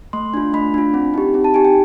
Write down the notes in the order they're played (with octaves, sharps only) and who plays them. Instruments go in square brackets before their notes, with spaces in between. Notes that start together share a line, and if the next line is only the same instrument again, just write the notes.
[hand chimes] A3 C6
D4 F4
A3 B5
D4 F4
C4
D#4 G4
C4
A5
D#4 G4 G#5
G5